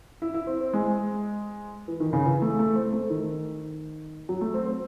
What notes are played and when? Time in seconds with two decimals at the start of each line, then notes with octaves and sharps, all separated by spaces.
0.22 E4
0.34 E4
0.47 C4
0.61 C4
0.73 G#3
1.88 E3
2.00 D#3
2.13 C#3
2.26 E3
2.42 A3
2.59 A3
2.76 C4
2.93 A3
3.10 D#3
4.29 F#3
4.41 A3
4.54 C4
4.66 C4